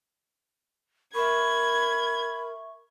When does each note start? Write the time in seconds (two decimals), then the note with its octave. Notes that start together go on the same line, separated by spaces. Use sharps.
1.15 A#4 E5 B5 C#6 G#6